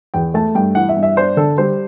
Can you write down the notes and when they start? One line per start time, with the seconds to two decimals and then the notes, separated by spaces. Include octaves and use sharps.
0.14 E2 G5
0.34 A3 A5
0.55 G2 G5
0.75 E3 F#5
0.89 E5
0.97 G2
1.03 E5
1.16 D4 C5
1.37 D3 A4
1.58 G3 C5